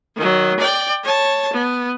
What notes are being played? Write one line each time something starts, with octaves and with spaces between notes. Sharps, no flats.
D#3 F#3
D5 G5
C#5 A5
B3